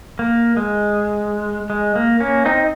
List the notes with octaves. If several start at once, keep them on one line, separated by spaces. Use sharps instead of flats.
A#3
G#3
G#3
A#3
A#3 C#4
C4 D#4